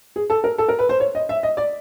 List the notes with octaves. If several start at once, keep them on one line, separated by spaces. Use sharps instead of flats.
G#4
A4
A#4
A4
A#4
B4
C5
C#5
D#5
E5
D#5
D5